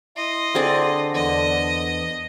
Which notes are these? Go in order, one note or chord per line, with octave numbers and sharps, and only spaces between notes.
E4 D#5 C6
D3 C4 G#4 D5
E2 B3 D#5